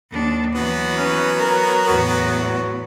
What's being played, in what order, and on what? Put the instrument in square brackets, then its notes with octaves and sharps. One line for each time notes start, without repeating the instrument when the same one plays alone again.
[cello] D#2 D4
[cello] E3 [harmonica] F#3 B3
[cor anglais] C#4
A#4
[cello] E2 A2 [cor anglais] F#4